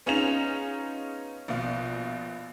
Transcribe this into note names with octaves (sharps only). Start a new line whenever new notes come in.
B3 C#4 D#4 F4 G#4 F7
A#1 B2 F4